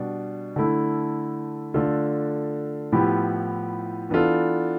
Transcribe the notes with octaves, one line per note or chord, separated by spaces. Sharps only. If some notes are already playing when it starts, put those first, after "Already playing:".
Already playing: B2 G3 D4
D3 A3 E4
D3 A3 D4 F4 A4
A2 F3 B3 E4 G4
E3 B3 D4 F4 A4